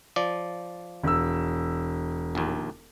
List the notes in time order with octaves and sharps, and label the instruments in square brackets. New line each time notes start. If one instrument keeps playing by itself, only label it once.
[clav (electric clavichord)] F3 D5
[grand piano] E1 E6
[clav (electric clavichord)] A#1 D#2